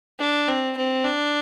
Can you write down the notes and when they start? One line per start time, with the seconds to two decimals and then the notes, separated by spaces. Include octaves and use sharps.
0.20 D4
0.48 C4
0.77 C4
1.04 D4